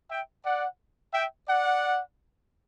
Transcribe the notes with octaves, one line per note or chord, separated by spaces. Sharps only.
E5 G5
D5 F#5
E5 G5
D5 F#5